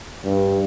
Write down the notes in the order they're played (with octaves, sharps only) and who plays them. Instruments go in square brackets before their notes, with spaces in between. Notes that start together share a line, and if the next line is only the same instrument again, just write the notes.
[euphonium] G2